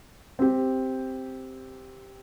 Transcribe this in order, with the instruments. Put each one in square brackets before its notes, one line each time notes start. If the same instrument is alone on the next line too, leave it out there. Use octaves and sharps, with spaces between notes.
[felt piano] C4 G4